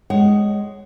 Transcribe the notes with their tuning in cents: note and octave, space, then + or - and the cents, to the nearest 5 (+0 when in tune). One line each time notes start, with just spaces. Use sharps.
G#3 -5 C#5 +0 F#5 +30